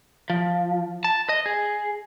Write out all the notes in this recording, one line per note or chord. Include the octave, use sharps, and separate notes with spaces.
F3
A5
D#5
G#4